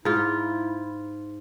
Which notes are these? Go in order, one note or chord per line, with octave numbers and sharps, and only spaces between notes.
G#2 E4 F4